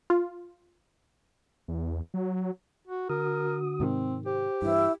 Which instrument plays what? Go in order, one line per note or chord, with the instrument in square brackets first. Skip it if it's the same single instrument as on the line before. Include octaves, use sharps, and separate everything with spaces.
[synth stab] F4
[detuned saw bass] E2
F#3
[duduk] F#4
[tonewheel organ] D3 F#4 D#6 [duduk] A#4
[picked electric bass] G#2 C3 D#3 [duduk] C4
[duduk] G4 [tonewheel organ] C5
[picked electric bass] G2 E3 [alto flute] E4